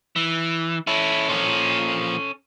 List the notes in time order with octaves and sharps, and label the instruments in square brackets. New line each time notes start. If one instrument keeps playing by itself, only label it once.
[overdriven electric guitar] E3
[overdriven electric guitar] C#4 A4 [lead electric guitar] E4
[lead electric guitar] A#2 F3